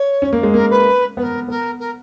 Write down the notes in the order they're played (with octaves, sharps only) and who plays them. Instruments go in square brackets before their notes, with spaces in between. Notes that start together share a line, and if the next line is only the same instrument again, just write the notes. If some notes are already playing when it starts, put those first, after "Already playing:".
Already playing: [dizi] C#5
[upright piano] C#4
A#3
G#3
[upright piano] A#3 [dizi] A#4
[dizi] B4
[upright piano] B3 [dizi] B4
[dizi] A#4
[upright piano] B3 [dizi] A#4
[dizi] A#4